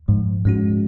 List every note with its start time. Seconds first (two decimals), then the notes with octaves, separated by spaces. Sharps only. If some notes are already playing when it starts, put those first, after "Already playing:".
0.08 G#2 F3
0.45 G#2 G#3 C#4 F#4